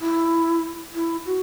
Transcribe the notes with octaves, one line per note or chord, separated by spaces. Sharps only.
E4
E4
F#4